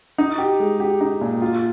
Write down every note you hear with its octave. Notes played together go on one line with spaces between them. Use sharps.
D#4
G4
G#3
G4
D#4
A#2
F4